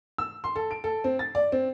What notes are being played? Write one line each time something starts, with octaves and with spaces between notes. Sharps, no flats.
E6
C6
A4
D7
A4
C4
A6
D5
C4